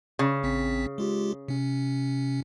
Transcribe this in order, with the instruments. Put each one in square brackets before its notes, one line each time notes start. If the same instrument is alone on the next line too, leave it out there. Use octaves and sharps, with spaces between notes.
[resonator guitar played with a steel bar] C#3
[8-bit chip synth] A1 C4 B6
G#3 F4 G4
C3 C#4